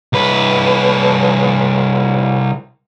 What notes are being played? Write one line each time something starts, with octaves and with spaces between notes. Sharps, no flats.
C2 B4